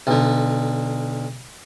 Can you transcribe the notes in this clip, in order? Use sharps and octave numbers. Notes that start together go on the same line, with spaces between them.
B1 D3